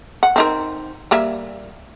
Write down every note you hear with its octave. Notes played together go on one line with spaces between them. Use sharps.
F#5
C4 D#4 A#4
G3 A#3 E5